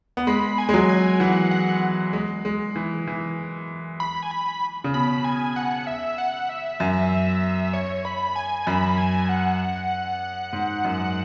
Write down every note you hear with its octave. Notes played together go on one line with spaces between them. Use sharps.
B3
G#3 B5
G#5
G#3
F#3
G#5
E3 F#5
F#5
G#3
G#3
E3
E3
B5
G#5
B5
C#3
B2 B5
G#5
F#5
E5
F#5
E5
F#2
C#5
B5
G#5
F#2 B5
G#5
F#5
G#2
F#2